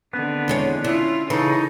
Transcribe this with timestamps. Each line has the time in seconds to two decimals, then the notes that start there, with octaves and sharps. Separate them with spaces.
0.13 D3 D#3 B3 C4
0.48 E2 G#3 C#5
0.84 C#4 D4 E4 F4
1.30 C#3 E3 D#4 A4